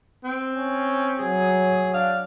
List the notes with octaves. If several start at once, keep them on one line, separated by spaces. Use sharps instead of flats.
C4
C#4
F#3 G#4
D4 F5